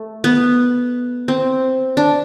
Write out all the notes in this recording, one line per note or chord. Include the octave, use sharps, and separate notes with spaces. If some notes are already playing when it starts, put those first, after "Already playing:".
Already playing: A3
B3
C4
D4